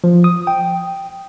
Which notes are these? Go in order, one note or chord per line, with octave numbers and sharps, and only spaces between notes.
F3
D#6
G5